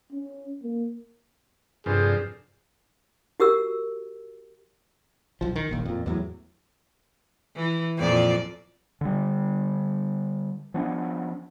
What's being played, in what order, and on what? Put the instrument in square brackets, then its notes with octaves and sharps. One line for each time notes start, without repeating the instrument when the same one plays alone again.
[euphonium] C#4
A#3
[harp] G2 A4 D5 [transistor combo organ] C3 F3 [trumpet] G#4
[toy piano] F#4 G4 A#4 E6
[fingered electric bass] B1 F3
D#3
D#1 A#1 D#2
F2 A#2
E2 A2 F#3
[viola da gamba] E3
F2 A#2 D5
[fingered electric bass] D3 G3
F3 B3 C#4 D4